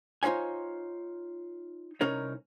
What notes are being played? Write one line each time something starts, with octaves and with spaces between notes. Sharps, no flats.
D#4 F4 C5 C#5 G#5
C2 C#4 D#4 A#4 C#5